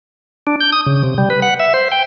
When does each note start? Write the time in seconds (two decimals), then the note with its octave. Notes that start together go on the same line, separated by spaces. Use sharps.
0.47 D4
0.61 G6
0.72 D#6
0.86 C#3
1.03 C3
1.18 G3
1.30 B4
1.42 F#5
1.60 E5
1.74 C5
1.92 G5